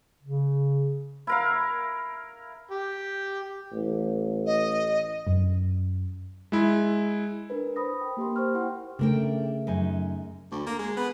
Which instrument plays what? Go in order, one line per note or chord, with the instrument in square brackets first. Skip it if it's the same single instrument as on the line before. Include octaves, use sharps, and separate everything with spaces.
[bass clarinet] C#3
[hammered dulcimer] E4 A#4 F5
[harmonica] G4
[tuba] A1
[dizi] D#5
[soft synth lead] F#2
[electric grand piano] G#3 E4
[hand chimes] D4 A#4 B4
C5 B5 D#6 A#6
G5
A#3 G4 A#4 C6
C5 C#6 F6
E4 F#5 G5 C6
[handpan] C#3 A3 [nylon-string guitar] D4 A#4 G5
[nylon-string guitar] F#2 D#4 G#5
[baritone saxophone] D2
A#3
G#3
B3